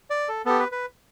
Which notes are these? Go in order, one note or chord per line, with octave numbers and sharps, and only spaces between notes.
D5
A4
B3 G4 A4
B4
B4